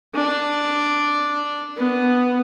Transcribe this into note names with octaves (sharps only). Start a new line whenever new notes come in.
D4
B3